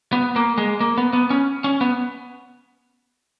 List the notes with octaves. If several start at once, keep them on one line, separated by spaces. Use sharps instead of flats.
B3
A#3
G#3
A#3
B3
B3
C#4
C#4
B3